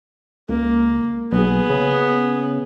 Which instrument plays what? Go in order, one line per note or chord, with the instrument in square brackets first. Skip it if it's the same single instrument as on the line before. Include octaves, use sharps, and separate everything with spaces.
[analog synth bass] C#2 [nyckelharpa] A#3
[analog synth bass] B1 [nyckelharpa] B3 G#4
[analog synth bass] C#3